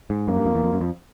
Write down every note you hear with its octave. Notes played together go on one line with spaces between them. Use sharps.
G#2
F#2 A#3
G2
F2
E2
F2
F#2
F2